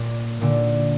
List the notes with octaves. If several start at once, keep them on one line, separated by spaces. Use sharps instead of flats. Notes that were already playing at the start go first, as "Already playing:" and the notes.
Already playing: A#2
A#2 D3